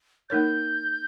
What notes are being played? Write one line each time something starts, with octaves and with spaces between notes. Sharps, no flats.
A#3 D#4 A#4 C#5 G6